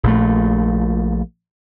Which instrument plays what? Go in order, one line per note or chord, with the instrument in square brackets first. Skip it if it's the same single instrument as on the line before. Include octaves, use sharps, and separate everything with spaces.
[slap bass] A#1 A#2 A3